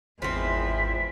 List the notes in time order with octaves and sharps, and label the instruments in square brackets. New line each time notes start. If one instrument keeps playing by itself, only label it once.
[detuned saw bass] G#1 [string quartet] E2 G#3 E4 [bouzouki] F3 C4 [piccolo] B6